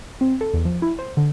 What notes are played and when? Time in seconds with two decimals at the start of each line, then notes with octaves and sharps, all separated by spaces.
0.21 C4
0.41 A4
0.54 E2
0.65 F3
0.82 E4
0.99 C5
1.17 D3